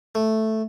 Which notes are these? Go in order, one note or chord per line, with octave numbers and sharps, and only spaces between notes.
A3